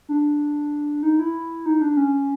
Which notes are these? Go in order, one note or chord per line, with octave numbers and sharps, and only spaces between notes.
D4
D#4
E4
D#4
D4
C#4